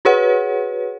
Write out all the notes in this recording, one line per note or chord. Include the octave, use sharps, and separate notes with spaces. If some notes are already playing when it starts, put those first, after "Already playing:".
F#4 G#4 B4 C#5 F#5